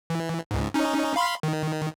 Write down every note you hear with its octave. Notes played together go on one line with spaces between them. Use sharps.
E3
C#2 G#2
C#4 D#4
F5 B5 C6
D#3